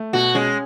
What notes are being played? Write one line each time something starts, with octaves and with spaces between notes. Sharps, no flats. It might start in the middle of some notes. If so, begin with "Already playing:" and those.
Already playing: A3
B2 F#4
G#3 C#4